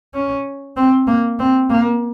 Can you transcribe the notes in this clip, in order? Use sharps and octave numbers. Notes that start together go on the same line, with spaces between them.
C#4
C4
A#3
C4
A#3